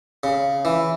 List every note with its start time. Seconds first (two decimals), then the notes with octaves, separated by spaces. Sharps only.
0.23 C#3
0.65 E3